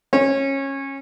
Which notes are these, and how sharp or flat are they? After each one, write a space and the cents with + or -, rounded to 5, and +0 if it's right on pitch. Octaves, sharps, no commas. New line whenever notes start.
C#4 -20